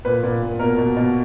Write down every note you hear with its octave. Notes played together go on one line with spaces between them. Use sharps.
A#2 B4
A#2
A#2
B2 A#4
B2
B2